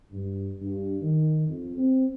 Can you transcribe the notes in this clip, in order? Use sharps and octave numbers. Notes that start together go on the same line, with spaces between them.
G2
G2
D#3
F2
C4